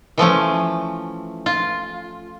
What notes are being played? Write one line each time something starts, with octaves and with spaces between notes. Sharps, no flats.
E3 F3 A3 C#4
F4